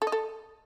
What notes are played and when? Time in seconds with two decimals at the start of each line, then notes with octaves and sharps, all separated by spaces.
0.02 A4
0.07 D#5
0.12 A4